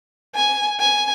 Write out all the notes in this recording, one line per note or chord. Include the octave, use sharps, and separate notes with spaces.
G#5
G#5